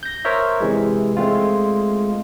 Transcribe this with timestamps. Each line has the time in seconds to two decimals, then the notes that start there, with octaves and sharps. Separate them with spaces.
0.03 G6 A#6
0.25 A#4 C5 C#5 E5
0.61 C3 E3 G#3
1.17 G#3 A3 C4 F4